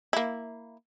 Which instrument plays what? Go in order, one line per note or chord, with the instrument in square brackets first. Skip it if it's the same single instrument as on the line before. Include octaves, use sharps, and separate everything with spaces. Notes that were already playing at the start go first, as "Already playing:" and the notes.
[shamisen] A#3 E4